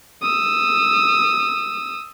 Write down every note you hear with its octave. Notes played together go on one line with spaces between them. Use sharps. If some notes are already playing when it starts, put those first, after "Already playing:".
D#6 E6